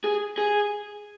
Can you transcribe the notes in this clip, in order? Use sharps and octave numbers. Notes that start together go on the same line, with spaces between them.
G#4
G#4